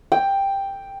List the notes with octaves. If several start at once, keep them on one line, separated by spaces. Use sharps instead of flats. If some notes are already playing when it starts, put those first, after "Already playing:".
G5